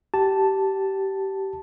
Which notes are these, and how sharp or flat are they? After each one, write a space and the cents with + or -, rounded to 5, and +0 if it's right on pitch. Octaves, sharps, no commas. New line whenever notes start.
G4 -20 A5 +0